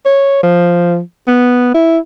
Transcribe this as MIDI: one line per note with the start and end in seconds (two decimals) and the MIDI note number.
0.05 0.43 73
0.43 0.99 53
1.27 1.71 59
1.74 1.98 64